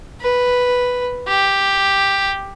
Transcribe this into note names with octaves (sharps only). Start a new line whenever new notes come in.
B4
G4